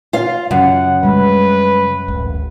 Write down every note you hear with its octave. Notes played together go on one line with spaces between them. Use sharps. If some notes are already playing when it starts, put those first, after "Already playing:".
F4 F5
F#2 C#3 F#5
C#3 G3 G#3 B4
D1 G#1